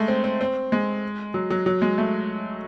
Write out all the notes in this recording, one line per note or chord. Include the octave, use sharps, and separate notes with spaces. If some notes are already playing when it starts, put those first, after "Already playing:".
Already playing: G#3 A3
C4
C4
C4
G#3
F#3
F#3
F#3
G#3
A3